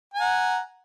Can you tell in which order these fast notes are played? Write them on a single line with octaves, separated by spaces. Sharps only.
G#5 A#5 F#5